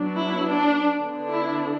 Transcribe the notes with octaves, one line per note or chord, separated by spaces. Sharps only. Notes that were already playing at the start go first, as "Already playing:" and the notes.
Already playing: F#3 B3 D4
E4
D4
D3 B3 D4
E4